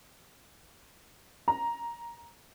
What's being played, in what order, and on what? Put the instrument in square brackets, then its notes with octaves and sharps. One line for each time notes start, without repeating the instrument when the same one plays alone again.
[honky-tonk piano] A#5